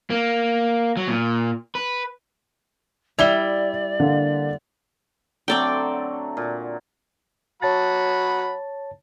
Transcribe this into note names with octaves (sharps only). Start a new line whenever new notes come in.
A#3
F#3
A#2
B4
G3 E4 D5 F7 G7
D3 A#3
D3 F#3 A3 C4 D5 G5
A#2
F#3 C#5 F#5 A5 B5 A6